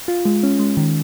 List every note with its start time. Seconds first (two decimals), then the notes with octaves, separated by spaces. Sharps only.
0.08 F4
0.25 G#3
0.43 C#4
0.60 G#3
0.77 D#3